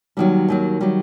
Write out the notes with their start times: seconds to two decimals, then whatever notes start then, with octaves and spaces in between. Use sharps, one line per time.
0.17 D#2 D#3 F#3 G3
0.49 D#2 D#3 F#3
0.81 D#3 F#3 G3